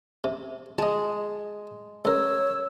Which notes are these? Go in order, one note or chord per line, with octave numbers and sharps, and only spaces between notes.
C3
G#3 D#5 A5
C#2 A#4 C#5 E6